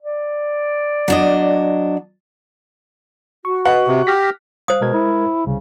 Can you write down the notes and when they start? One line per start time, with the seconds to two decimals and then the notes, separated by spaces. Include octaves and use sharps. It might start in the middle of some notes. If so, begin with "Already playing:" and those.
0.02 D5
1.08 F#3 D4 D#5
3.45 F#4 C#6
3.65 B4 D#5 F#5
3.87 C3
4.07 G4 F6 A#6 B6
4.68 C5 F5 D#6
4.81 B2 G#3 A#4 G#6
4.93 E4
5.46 C2 C#3